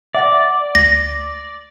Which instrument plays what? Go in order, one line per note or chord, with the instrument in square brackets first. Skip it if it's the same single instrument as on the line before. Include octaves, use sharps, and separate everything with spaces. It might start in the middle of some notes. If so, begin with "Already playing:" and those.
[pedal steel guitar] D5 [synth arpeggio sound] E5 F#5 A#6
[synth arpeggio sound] D2 B6 [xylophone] A#6